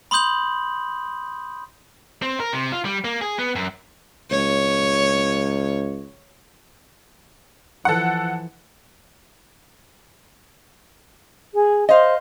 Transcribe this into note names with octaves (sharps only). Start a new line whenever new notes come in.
B5 C6 D#6 G6 F#7
C4
A#4
C3
F4
G3
A#3
G#4
B3
F#2
C#2 C#5
E3 F3 A4 F#5
G#4
C5 D#5 F5